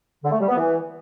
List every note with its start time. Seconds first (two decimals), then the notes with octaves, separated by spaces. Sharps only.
0.23 D3
0.32 A3
0.40 G3
0.48 B3
0.57 E3